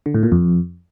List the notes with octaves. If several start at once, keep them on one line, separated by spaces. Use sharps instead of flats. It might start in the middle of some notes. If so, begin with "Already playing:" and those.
D3
A2
A#2
F2